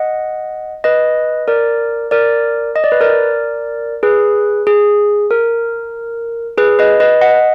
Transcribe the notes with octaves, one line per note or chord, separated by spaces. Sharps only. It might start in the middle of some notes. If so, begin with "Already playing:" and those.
Already playing: D#5 F#5
B4 D#5
A#4 D5
A#4 D5
D#5
D5
B4
A#4 D5
G#4 B4
G#4
A#4
G#4 B4
B4 D#5
B4 D#5
D#5 F#5